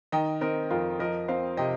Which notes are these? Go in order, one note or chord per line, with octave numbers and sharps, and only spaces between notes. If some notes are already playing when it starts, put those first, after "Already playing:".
D#3 D#5 G5
C4 A#4 D#5
F2 F4 A#4
F3 A#4 D#5
C4 C5 F5
C3 D#5 G5